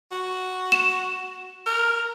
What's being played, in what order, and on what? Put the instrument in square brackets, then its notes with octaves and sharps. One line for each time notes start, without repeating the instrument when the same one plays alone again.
[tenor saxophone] F#4
[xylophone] E7
[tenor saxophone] A#4